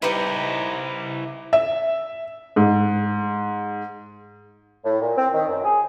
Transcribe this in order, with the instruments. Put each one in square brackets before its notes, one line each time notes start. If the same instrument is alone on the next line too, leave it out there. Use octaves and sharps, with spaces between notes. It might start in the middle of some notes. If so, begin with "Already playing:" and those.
[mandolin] D#4 G4 B4 [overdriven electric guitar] E4 C5 [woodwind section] D5 G#5 A#5
[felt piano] E5
G#2
[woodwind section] A2
A#2
C4
D#3
F#2
G#4